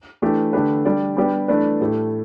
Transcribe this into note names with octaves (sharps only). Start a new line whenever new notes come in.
E3 A3 D4 G4
D3 A3 D4 G4 B4
G3 D4 G4 D5
G3 B3 D4 G4 D5
E3 A3 D4 B4 D5
A2 A3 G4